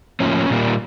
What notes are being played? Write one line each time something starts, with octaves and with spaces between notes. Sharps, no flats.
A2 F3 A#3 C#4
A#2 G3 A#3